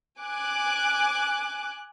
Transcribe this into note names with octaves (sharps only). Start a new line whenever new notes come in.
G#5 D6 F#6